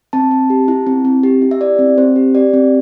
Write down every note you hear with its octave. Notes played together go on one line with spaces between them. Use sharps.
C4 A5
C4
G4
E4
C4
C4
G4
E4
E5
G4 D5
C4
C4 C5
G4
G4 D5
C4